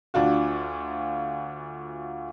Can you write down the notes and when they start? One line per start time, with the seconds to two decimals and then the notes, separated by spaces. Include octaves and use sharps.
0.14 D2 D4 F4 F#4